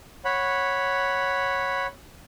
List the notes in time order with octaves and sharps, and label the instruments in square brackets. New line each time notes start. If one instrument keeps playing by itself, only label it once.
[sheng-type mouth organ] C#5 F#5 B5